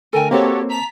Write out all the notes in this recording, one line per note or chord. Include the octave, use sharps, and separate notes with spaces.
D3 A3 A4 A#4 G5 G#5
A#3 C4 F#4 G4 A4 C#5 D#5
A5 A#5 B6